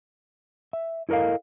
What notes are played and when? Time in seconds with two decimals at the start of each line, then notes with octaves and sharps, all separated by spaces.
0.73 E5
1.09 E4 A4 A#4 D#5 F5